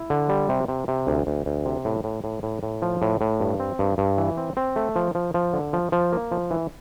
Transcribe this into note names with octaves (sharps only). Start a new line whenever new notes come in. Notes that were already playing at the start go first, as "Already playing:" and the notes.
Already playing: E4
D3
G3
C3
C3
C3
D2
D2
D2
C3
A2
A2
A2
A2
A2
F3
A2
A2
G2
C4
G2
G2
E3
C4
C4
A3
F3
F3
F3
D3
F3
F3
A#3
F3
E3